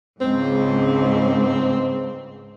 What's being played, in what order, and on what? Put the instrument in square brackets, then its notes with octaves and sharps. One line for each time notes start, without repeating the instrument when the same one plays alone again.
[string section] C#2 G#2 [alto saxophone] C4